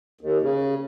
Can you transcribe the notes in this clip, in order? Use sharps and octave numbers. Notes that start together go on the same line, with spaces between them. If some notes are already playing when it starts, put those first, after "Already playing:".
D#2
C#3